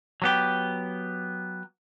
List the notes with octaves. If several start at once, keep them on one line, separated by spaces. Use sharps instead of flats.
F#3 B3 G4